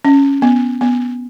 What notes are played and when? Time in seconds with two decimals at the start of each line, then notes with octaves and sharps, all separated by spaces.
0.05 C#4
0.42 B3
0.81 B3